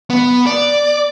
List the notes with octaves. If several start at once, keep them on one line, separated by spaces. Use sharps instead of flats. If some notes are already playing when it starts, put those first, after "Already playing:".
B3
D5